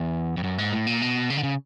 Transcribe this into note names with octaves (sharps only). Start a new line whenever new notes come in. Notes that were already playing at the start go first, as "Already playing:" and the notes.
Already playing: E2
F2
F#2
G#2
A2
A#2
B2
C#3
D3
C#3